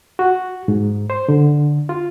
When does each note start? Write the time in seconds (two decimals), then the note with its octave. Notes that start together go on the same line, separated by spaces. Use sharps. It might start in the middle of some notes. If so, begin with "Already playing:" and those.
0.19 F#4
0.68 G#2
1.10 C5
1.28 D3
1.89 F4